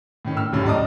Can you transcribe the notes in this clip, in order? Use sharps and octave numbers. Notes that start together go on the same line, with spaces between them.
A2 D#3 C#4
E6 F6
D#1 C#2 F#2 A2 C#4
D5 D#5 A5 A#5 D#6 F6